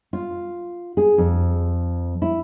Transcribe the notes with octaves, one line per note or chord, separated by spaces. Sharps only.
F4
G#4
F2
E4